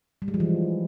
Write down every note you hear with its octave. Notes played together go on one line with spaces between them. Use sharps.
G3
G#3
F3
E3